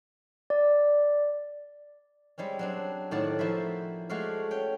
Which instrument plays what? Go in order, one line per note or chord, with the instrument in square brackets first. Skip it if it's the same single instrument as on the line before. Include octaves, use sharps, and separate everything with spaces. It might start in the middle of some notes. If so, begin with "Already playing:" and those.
[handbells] D5
[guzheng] G3 G#3 C4 C#4
F#3 C4 D4
A2 D#3 F#4 D5 F#5 A5
F3 A#3 E4 C5 E5
G#3 A3 F#4 D5 F5
C#4 G5